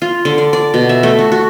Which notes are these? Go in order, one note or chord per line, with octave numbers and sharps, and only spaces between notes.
F4
D3
D5
D5
B2
E5
A3
F#4
F#4